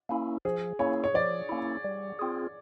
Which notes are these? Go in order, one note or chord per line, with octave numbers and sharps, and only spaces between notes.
A#3 C#4 E4
F3 G#4
A#3 C#4 E4 C#5
C#5
F3 D5
A#3 C#4 E4
G3
C4 F4 G#4